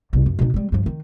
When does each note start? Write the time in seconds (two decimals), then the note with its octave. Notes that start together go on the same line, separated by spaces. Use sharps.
0.13 E1 C2
0.26 F#2
0.39 B2 D#4
0.54 G3 G#3
0.72 G2 F3
0.86 D#3